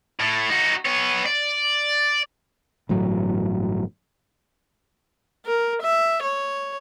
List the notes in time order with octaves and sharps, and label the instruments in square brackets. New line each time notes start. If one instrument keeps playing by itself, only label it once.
[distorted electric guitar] A2
D#4 F#4
B3 C#5
D5
[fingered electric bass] G1 A2 E3 F#3
[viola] A#4
E5
C#5